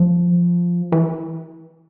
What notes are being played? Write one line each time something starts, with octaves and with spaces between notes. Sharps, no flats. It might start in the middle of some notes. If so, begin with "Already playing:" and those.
Already playing: F3
E3